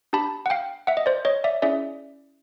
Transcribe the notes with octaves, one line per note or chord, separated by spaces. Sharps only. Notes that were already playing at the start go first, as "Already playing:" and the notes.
D4 G4 A5 B5
F#5
F5 G5
E5 F#5
D#5
C5 D5
C#5 D#5
D5 E5
C#4 E4 G#4 D5 E5